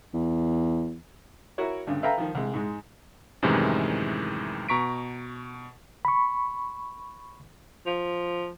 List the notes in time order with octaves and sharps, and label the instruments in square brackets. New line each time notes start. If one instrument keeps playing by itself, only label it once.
[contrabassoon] E2
[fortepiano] E4 F#4 A#4 C#5
D2 G2 C#3
A4 B4 E5 F5 G5 A#5
D#3 F3
C2 G#3
G#2 G#3
[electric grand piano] F#2 A2 C3 D#3 E3 G#3
B2 A#5 C#6 B6 D7
[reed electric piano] B5 C#6
[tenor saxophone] F3